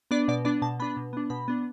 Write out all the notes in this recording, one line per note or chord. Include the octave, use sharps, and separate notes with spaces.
B3 D4 D5
B2 D5
B3 D4 D5
B2 A5
B3 D4 B5
B2
B3 D4
B2 B5
B3 D4